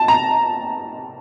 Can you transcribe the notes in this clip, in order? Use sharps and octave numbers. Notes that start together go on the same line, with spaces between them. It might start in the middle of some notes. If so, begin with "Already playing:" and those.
Already playing: A5
A#5